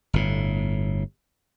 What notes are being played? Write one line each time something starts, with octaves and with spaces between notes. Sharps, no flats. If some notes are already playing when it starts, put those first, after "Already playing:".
G1 A2